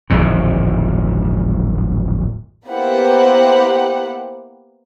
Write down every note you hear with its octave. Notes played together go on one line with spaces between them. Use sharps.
D1 G#1 F2 A#2
A#3 B3 E4 G4 C5 F#5